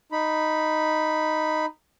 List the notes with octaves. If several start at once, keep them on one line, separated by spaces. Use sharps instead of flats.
D#4 B5